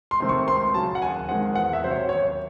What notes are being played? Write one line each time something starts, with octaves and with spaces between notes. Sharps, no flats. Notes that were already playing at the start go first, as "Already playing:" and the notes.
C6
C3 D#3 A3 C4
C#6
C#2 C6
C#3 F#3 A5
F#5
D#2 G#5
D#3 G#3 C4 F#5
E2 F#5
E5
C3 F#3 C#4 C5
C#5
D#2 C#5